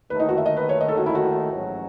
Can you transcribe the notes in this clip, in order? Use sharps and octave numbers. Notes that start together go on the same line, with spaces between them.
D#2 D#3 A3 B4
D#4
F#4
E5
D#5
B4
C#5
D#5
A4
F#4
E4
F#4
A1 G#2 F#3 C#4